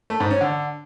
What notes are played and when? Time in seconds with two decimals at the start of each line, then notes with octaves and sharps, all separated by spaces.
0.10 A3
0.20 G#2
0.31 C#4
0.41 D3